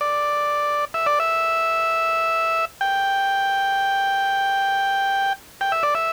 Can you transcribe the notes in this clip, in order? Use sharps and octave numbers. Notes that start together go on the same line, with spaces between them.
D5
E5
D5
E5
G5
G5
E5
D5
E5